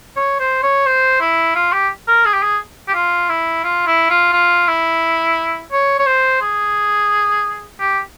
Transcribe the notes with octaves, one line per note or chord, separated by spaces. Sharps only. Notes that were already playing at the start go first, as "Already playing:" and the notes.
C#5
C5
C#5
C5
E4
F4
G4
A#4
G#4
G4
G#4
G4
F4
E4
F4
E4
F4
F4
E4
C#5
C#5
C5
G#4
G4